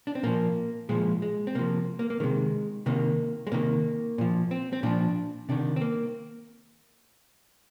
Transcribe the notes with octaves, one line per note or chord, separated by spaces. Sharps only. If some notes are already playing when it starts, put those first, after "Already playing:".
D4
C4
A#2 F3 A#3
A#2 F3 G#3
G#3
C4
C3 F3 A#3
A#3
A#3
C3 D#3 G#3
C3 D#3 A#3
G#3
C3 D#3 A#3
A#2 F3
C4
C4
A#2 F3 D4
C3 D#3 D4
C4
A#3